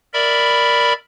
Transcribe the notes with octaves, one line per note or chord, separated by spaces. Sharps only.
A#4 D5 E5 B5